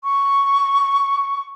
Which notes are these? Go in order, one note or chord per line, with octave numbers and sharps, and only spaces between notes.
C#6